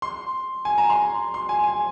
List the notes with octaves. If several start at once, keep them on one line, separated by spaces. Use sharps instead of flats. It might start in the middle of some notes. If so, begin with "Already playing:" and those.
C6
G#5
A#5
C6
C6
G#5
G#5